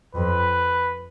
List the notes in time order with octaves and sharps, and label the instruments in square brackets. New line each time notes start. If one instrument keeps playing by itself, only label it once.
[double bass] F2 [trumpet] B4